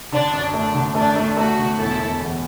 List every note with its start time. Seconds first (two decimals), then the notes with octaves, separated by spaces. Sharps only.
0.12 D3 D4
0.33 F#2
0.54 A3 D4
0.74 D3
0.95 A3 D4
1.16 A3
1.37 A3 F#4
1.58 D3
1.78 E1 E4 A4
1.99 E1
2.19 E2